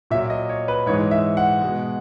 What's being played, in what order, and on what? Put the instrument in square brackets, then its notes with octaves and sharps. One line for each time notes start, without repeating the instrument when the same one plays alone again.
[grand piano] A#2 E5
F#3
D#5
C#5
B4
G#2 E3 G#3 C#5
E5
F#5
B2 G#3